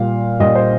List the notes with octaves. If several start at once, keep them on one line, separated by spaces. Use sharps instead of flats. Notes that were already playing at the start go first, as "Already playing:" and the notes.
Already playing: A#2 G3 F5
A#2 G3 D#5
C5